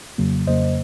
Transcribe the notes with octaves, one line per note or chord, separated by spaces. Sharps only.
F2 C#3 F#3 A#3
F2 C#3 F#3 A#3 C5 D#5